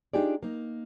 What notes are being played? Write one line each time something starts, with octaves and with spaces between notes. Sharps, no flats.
D4 D#4 F4 G4 G#4 D5
A#3 D#4